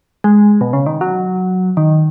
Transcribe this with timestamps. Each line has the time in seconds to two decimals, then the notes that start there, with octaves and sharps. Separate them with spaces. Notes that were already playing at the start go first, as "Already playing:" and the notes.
0.24 G#3
0.61 B2
0.73 C#3
0.86 D#3
1.01 F#3
1.77 D#3